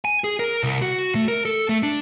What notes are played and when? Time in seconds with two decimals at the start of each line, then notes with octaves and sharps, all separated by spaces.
0.05 G#5
0.24 G#4
0.39 A#4
0.63 C2
0.82 F#4
1.15 A3
1.28 A#4
1.45 A4
1.69 A3
1.83 D4